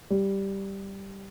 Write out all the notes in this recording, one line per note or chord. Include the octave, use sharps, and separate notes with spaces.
G3